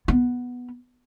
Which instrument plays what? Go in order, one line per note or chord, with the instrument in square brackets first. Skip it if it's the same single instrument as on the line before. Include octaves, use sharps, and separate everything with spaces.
[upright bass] B3